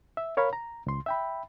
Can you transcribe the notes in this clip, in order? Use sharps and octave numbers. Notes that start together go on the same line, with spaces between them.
E5
A#4 C#5 F5 B5
A#5
C#2 C6
E5 G5 B5